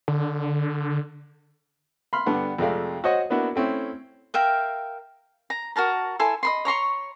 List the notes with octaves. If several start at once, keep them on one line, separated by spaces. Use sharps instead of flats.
D3
B5 C6 F6
G2 D3 B3 F#5
F2 C3 G#3 A3 D5 F5
F#4 C5 C#5 D#5 F#5
A#3 B3 D4 E4 F#4
A3 C4 C#4 E4
A#4 E5 F5 G5
A#5
F#4 A#4 A5 A#5
E4 A4 G#5 C6
D#5 B5 C6
C#5 A#5 C6 C#6